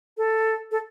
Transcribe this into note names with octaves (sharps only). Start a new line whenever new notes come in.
A4
A4